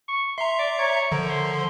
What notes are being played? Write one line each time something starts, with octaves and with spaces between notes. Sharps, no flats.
C#6
E5 A#5 C6
D5
C#5
D3 F3 A#4
C6